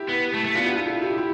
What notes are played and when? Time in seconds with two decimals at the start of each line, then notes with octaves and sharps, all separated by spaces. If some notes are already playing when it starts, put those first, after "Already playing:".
Already playing: E4 G4
0.09 B3
0.34 A3
0.45 A3
0.55 B3 D4 F4
0.66 E4 G4
0.76 F4 A4
0.86 E4 G4
1.02 E4 G4
1.17 E4 G4